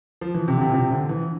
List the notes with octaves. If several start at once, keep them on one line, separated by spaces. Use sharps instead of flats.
F3
E3
C3
D3
C3
A#2
C3
D3
E3